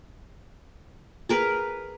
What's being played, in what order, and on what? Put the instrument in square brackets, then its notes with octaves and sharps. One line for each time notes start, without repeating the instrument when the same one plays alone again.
[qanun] G#4 A#4 B4